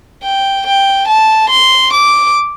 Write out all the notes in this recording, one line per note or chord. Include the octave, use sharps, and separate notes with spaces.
G5
G5
A5
C6
D6